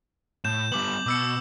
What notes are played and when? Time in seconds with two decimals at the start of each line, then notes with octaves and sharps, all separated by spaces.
0.44 A2 G6 E7
0.72 G3 B3 D6 F#7
1.06 B2 D6 E6 C#7